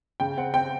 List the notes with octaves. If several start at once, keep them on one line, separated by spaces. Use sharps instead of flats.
C#3 G5
C4 F#5
C4 G5